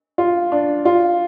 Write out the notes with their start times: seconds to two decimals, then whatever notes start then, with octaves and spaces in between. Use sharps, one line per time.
0.18 F4
0.52 D4
0.85 F4